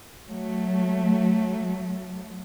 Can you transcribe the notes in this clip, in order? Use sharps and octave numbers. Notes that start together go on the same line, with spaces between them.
F#3 A3